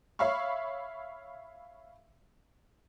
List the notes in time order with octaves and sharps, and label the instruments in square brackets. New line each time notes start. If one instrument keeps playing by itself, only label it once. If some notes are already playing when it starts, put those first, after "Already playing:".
[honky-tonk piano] C#5 E5 F5 B5 C#6